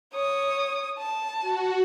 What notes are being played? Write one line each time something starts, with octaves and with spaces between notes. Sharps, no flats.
C#5 D#6
A5
F#4